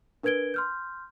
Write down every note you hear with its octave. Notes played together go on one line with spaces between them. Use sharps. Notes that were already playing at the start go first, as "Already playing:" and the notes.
D4 A#4 B4 G#6 D7 G7
C6 F6 G6